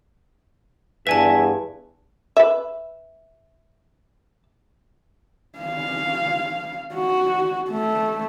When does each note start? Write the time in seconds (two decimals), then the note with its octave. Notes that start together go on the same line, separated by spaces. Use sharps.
1.07 E2 G2 B4 E5 G#5 A5
2.37 B4 E5
5.59 F5
6.95 F#4
7.70 A3